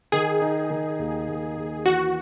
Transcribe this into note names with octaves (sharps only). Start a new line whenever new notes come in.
D#3 G#4
D#4
D#3
D#2
D#2
D#2
E3 F#4